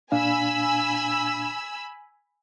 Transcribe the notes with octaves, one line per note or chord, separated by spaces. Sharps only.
A#2 D4 F5 G#5 B5 E6